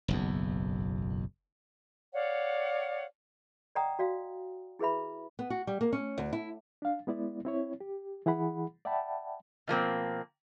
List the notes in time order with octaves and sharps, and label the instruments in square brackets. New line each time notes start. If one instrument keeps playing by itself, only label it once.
[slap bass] F#1 B1 E2
[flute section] C#5 D5 F5 F#5
[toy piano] D5 D#5 F#5 G5 A#5 D#6
F#4 D5 F5
E4 G#4 B4 E5 B5
[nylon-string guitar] B3
F#4
G3
A#3
C#4
D2
E4
[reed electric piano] D4 F5
G#3 B3 E4 D5
C4 E4 C#5
G4
E3 E4 G#4 F#5 B5
D5 E5 F#5 G5 A5 B5
[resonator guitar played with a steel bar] B2 F3 A#3 C4